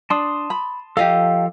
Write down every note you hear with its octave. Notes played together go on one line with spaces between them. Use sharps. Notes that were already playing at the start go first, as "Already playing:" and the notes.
D4 A5 C6 D#6
B5
F3 G4 A4 D#5 F5